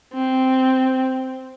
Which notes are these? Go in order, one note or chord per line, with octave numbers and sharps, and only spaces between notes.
C4